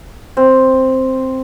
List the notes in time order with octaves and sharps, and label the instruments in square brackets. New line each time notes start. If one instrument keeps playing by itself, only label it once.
[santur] C4